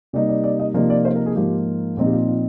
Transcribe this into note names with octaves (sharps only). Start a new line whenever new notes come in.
C3 G3 A#3 D#4 D5
D5
D5
D#5
C3 F3 A#3 D#4 D5
D5
C5
A#4
G#4
G#2 F3 A#3 G4
A#2 F3 C4 D#4
G4
F4
F4